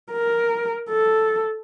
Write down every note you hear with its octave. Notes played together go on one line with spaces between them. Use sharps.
A#4
A4